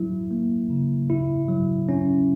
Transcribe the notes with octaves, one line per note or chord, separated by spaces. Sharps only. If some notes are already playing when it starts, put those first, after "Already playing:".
Already playing: F#3 E4
A#3
C#3
E4
F#3
C#4